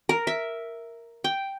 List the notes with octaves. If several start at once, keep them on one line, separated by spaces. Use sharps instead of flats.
A#4
E5
G5